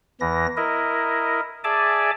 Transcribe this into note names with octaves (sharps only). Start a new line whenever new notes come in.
E2 E3 A#6
E4 A#4 D#5
G#4 D5 E5 G#5 A5 D6